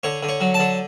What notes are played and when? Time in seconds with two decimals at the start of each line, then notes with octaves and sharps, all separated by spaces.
0.03 D3 C#5
0.23 D3
0.29 C#5
0.41 F#3
0.54 A5
0.59 D3